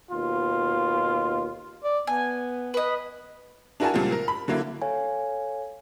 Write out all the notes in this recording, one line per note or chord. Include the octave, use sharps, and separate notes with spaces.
D#2 B2 F4
D5
B3 G#5
B4 D#5
D4 E4 F#4 A#4 G#5 A5
C#2 A#2 F3 G3 F4
A#4
B5
D3 F#3 A#3 E4
A4 C#5 F5 G#5